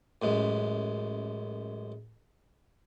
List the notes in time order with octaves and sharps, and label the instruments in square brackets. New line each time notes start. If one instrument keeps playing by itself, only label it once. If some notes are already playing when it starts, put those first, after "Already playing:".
[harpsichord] A1 F#2 G#3